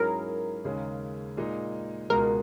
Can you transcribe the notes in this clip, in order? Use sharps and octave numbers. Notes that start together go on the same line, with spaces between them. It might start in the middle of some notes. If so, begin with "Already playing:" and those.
Already playing: G#2 F#3 C#4 E4 G#4 A#4
D#2 C#3 G#3 C#4
A#2 G#3 D#4
C#2 B2 G#3 A#4